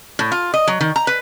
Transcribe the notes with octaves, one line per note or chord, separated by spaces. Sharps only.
A2
F4
D#5
F#3
D#3
A#5
B4